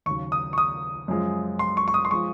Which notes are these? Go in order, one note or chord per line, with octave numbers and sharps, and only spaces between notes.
D#2 C#3 F#3 C#6
D#6
C#6
D#6
F#2 F3 G#3
C6
C#6
C#6
D#6
C6
F3 G#3 C#6